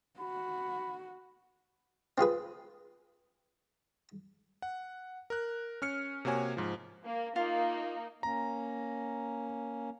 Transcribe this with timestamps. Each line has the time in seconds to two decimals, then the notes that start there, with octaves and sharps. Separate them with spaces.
0.19 F#4 B5
2.18 C4 F4 G#4 B4
4.62 F#5
5.30 A#4 F#6
5.82 C#4 F6 C#7
6.25 C3 A#3 F#4 C#5 G#5
6.57 G#2 F3
7.03 A#3
7.36 A#3 D#4 F4
8.23 A#3 C#4 A#5